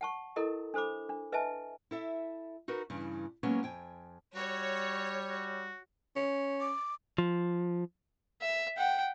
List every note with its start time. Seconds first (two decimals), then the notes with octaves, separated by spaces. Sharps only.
0.01 F#5 A5 C#6
0.36 E4 A4 A#4 D#5 A#5
0.74 D4 A4 C5 B5 D6
1.09 D4
1.32 B4 D#5 E5 G#5 A5
1.91 E4 A4 E5
2.68 D#4 F#4 A#4 B4
2.90 G2 C#3 E3
3.43 F#3 G#3 A#3 B3 C#4
3.63 F2 G5 G#5
4.35 G3 F#4 C#5
5.29 F#4
6.16 C#4
6.60 D6
7.18 F3
8.42 E5
8.77 F#5 G5